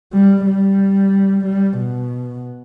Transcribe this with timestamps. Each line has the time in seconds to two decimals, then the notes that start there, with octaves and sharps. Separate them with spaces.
0.13 G3
0.46 G3
1.45 G3
1.77 B2